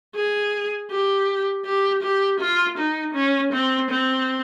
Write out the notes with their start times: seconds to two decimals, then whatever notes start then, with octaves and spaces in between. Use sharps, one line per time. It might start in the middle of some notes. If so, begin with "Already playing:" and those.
0.15 G#4
0.91 G4
1.65 G4
2.03 G4
2.40 F4
2.78 D#4
3.15 C#4
3.53 C4
3.91 C4